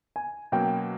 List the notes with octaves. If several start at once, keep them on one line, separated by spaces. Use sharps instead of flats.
G#5
B2 F#3 A#3 C#4 G5